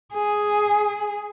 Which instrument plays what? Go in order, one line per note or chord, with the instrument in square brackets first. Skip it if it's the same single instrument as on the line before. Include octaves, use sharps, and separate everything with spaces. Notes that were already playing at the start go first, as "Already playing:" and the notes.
[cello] G#4